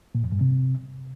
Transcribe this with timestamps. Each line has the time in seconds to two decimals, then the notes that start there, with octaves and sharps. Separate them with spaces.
0.15 A#2
0.23 F2
0.32 G2
0.41 C3